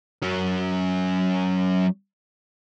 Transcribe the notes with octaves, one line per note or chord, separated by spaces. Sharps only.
F#3 C#4